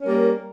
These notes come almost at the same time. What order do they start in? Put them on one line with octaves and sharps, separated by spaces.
C#4 A#4 G3 A#3